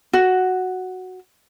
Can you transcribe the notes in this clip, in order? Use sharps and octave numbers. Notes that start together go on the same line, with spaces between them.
F#4